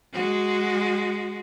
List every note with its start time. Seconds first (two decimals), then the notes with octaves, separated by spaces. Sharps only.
0.13 G#3 F#4